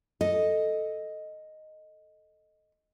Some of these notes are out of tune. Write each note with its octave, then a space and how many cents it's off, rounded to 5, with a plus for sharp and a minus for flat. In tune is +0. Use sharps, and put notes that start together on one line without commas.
A4 +0 D#5 +0